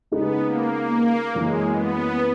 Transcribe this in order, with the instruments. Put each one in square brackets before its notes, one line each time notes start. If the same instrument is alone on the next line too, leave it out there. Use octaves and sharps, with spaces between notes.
[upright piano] C#3 G#3 D#4 [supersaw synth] B3
[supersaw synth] A#3
A#3
[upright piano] F#2 E3 A#3 C#4 E4 [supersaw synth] G#3
[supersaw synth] B3